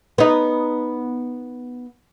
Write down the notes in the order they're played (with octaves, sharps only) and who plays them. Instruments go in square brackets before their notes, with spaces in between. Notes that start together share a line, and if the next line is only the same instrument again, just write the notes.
[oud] B3 D#4